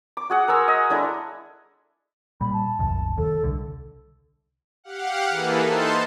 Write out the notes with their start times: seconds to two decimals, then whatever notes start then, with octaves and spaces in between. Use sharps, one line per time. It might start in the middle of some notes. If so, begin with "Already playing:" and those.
0.17 D6
0.30 F#4 G#4 F#5
0.48 A#4 C5 G#5 E6
0.68 D#5
0.90 G#3 D4 E4 A4
2.41 A#2 G3 B5
2.54 A5
2.79 D#1 C2 F#2
3.17 D#2 A4
3.43 C2 D3
4.84 G4 F5 F#5
5.30 E3 A#3 G#4 A4 B4
5.66 D#4 A4 C5 A5 C6